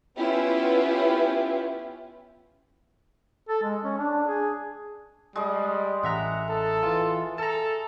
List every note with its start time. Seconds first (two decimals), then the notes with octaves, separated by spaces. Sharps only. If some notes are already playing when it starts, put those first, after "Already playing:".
0.17 B3 C#4 E4 F4 G4 B4
3.49 A4
3.63 G#3
3.83 C#4
3.98 D4
4.28 G#4
5.36 G3 G#3 D#5
6.03 A1 E5 F#5 A#5
6.49 A4
6.83 E3 F4 E5
7.38 A4 A5 A#5